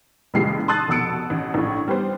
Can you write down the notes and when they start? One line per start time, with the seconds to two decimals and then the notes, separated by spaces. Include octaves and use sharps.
0.34 F#1 A#2 E3 G#3 G4 C7
0.68 A5 C6 D#6 E6 F#6 A6
0.88 F1 B2 A5 E6 C#7 D7
1.30 A1
1.54 A#1 A2
1.88 G3 B3 C5